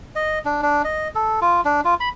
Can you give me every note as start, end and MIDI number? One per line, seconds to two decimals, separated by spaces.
0.16 0.39 75
0.45 0.61 62
0.62 0.82 62
0.84 1.08 75
1.15 1.40 69
1.41 1.61 65
1.65 1.81 62
1.85 1.94 65
2.00 2.09 83